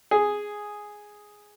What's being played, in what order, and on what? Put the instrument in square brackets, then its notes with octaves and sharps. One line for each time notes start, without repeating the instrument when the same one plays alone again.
[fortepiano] G#4